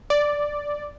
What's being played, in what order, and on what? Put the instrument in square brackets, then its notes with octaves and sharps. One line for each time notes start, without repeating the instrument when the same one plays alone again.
[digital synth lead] D5